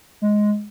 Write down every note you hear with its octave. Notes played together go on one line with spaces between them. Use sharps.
G#3